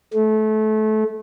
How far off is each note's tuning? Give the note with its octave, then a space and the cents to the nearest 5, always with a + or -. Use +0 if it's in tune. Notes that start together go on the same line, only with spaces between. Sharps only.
A3 -25